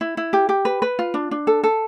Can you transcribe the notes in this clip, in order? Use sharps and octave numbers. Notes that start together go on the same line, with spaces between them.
E4
E4
G4
G4
B4
B4
F4
D4
D4
A4
A4